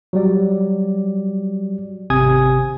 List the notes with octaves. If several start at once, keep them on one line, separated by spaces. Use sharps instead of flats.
F#3 G3 D5
G#1 C3 G#5 D#6 G#6